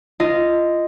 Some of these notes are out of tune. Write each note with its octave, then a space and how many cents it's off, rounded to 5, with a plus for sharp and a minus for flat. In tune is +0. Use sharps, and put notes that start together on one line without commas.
F4 -20 D#5 +0